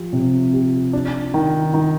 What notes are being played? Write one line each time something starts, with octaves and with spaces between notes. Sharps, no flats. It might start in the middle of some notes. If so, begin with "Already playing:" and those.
Already playing: F3 G4
C3
G4
D4
D#3
D#3